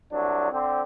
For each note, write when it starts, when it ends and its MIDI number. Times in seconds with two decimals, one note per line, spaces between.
0.12 0.49 36
0.12 0.49 54
0.12 0.49 62
0.52 0.81 50
0.52 0.81 60